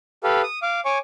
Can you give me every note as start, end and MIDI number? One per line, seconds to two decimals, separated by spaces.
0.24 0.42 67
0.24 0.42 69
0.24 0.42 71
0.24 0.42 77
0.43 0.59 87
0.62 0.80 77
0.62 0.80 86
0.85 0.98 73
0.85 0.98 80
0.85 0.98 85
0.85 0.98 86